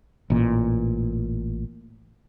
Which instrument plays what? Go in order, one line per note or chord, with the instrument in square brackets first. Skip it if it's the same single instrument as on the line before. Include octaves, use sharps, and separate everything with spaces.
[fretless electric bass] A1 A#2